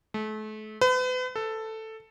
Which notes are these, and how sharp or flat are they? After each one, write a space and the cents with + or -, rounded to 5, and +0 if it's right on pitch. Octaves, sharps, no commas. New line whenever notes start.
A3 -35
B4 +40
A4 +5